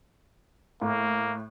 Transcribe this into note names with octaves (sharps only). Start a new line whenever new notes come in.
A2 A#3